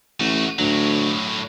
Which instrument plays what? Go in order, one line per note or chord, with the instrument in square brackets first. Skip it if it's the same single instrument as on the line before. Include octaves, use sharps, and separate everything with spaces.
[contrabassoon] A1 [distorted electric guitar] A3 F#4
[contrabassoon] D2 [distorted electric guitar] A2 F#3